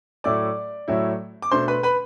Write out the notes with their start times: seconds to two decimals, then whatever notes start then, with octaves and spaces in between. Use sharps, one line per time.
0.24 A2 F#3 A3 E4 D5 D6
0.88 A2 F#3 A3 E4
1.42 D6
1.51 B2 A3 D4 C5 C6
1.68 B4 B5
1.83 B4 B5